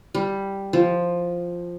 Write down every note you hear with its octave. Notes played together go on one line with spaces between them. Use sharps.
G3
F3